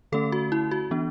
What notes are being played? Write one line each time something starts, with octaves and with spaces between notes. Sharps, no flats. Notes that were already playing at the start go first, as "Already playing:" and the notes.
D3 A3 C#4 A4
F#4
E4
F#4
E3 B3 D4